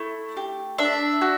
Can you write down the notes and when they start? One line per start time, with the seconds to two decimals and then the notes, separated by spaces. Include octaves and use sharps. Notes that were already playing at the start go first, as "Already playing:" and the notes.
Already playing: A3 E4
0.37 G4
0.78 D4 E5
1.21 F#4